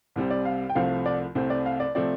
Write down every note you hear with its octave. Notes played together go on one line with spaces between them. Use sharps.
C2 C3 G3 C4
D5
F5
G5
C2 C3 F3 A3 C4 F5
D5
C2 C3 A3 C4
D5
F5
D5
C3 F3 A3 C4 D5